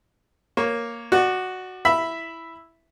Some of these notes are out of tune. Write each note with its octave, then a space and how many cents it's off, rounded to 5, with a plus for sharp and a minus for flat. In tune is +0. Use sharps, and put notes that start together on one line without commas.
A#3 +0 C#5 +0
F#4 +0 D5 +25
E4 +0 E5 +0 B5 +0